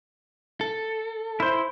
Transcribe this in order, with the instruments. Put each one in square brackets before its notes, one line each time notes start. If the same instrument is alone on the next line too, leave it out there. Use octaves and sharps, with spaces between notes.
[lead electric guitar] A4
[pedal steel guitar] E4 C5